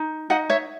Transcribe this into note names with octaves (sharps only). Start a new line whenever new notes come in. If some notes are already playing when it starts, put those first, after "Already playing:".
Already playing: D#4
D#4 D#5 F#5
C#5 E5